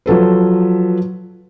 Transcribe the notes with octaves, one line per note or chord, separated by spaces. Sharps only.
F3 F#3 A4 B4